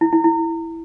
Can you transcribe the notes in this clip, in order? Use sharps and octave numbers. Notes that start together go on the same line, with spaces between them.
E4
E4
E4